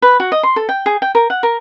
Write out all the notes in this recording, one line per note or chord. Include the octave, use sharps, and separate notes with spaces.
B4
F#4
D#5
C6
A4
G5
G#4
G5
A#4
F#5
A#4